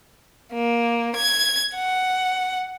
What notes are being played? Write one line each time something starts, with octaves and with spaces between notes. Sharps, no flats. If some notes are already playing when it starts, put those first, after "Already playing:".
A#3
G#6
F#5